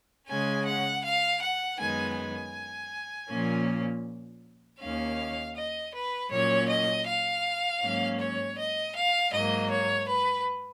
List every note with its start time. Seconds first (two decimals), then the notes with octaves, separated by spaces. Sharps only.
0.28 C#3 G#3 C#4 G#5
0.65 F#5
1.03 F5
1.41 F#5
1.79 F#2 D#3 G#3 B3 G#5
2.16 G#5
3.29 A#2 F3 A#3 C#4
4.80 D#2 D#3 A#3 C#4 F5
5.55 D#5
5.93 B4
6.31 A#2 F#3 A#3 C#4 C#5
6.69 D#5
7.06 F5
7.82 G#2 F#3 A#3 C#4
8.19 C#5
8.57 D#5
8.95 F5
9.32 G#2 F#3 A#3 D#5
9.70 C#5
10.08 B4